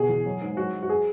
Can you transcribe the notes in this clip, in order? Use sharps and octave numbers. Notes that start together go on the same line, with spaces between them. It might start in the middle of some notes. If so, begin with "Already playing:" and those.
Already playing: B2 G#4
E2
F#3
G#2
F#3 F#4
F#3
F#4
G#4